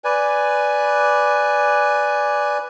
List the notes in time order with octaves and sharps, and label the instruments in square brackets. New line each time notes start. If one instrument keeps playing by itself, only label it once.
[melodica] B4 D5 G#5